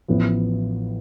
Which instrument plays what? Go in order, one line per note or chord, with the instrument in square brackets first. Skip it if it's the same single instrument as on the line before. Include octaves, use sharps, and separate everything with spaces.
[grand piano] A1 A2 F3 B3